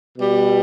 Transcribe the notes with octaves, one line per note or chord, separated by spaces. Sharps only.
B2 G3